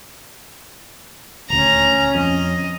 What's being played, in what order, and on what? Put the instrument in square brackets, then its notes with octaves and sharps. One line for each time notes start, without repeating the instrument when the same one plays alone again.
[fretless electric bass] D#1 D2 [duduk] C#4 [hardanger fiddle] A#5
[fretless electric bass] F2 [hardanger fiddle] D#5